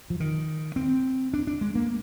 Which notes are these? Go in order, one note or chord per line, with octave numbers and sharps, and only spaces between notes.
F3
D#3
C4
D4
D4
G#3
A#3